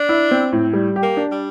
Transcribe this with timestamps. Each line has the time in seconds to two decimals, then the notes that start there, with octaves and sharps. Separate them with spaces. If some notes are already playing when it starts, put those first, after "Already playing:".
Already playing: D4
0.09 E4
0.31 C4
0.52 A2
0.73 G3
0.96 G4
1.03 A#3
1.17 D4
1.32 G3